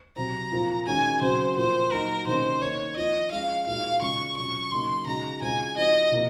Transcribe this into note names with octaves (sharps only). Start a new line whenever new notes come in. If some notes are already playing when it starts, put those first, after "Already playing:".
C3 F#3 C4 A#5
A#2 F3 C4 F4
D#3 G#3 C#4 F#4 G#5
C#3 F#3 C4 F#4 C5
A#2 F3 A#3 C5
F#3 A#3 D#4 F#4 A#4
C3 D#3 A#3 C#4 C5
D#3 A#3 D#4 C#5
F3 C4 F4 D#5
F3 G#3 C#4 F5
A#2 G#3 D#4 F#4 F5
C#3 G#3 C#4 F4 C#6
C3 F#3 C#4 F4 C#6
C#3 F#3 A#3 D#4 C6
C#3 G#3 D#4 F#4 A#5
C#3 G#3 C4 F4 G#5
F3 C4 D#4 F#4 D#5
C3 F3 A#3